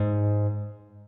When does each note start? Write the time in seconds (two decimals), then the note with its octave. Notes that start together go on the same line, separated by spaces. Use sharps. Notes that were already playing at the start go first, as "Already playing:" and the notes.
Already playing: G#2